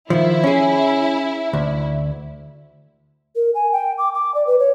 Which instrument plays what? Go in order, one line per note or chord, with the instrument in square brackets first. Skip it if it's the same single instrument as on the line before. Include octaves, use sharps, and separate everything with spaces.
[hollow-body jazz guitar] D#3 F3 [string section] E4
[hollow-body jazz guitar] C#4 G#4
D2
[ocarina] A#4
G#5
G5
D6
D6
D5
B4
C#5